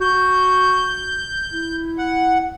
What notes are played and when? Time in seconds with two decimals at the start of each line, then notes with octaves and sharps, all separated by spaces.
0.01 F#4 G6
1.52 E4
1.98 F#5